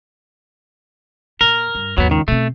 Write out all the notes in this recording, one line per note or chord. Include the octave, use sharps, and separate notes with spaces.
A#2 A#4
G2
D#2 G#2 F#3 B3
C#2 D#3
B2 A3 C4